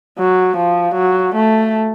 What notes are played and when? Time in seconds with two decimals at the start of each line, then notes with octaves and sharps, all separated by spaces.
0.18 F#3
0.57 F3
0.95 F#3
1.35 A3